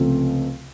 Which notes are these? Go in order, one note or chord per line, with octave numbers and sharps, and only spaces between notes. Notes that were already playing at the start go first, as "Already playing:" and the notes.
Already playing: C#2 C3 F3 A3 C4